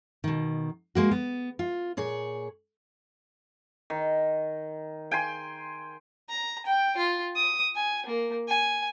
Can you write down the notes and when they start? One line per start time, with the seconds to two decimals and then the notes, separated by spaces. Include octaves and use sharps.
0.24 B2 D#3
0.95 G#3 A#3 F#4
1.11 B3
1.59 F4
1.97 A#2 G#4 C#5
3.90 D#3
5.11 G5 G#5 C6
6.29 A#5
6.66 G5
6.97 F4
7.36 D#6
7.76 G#5
8.06 A#3
8.48 G#5